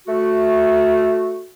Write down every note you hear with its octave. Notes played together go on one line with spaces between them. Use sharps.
A3 F#4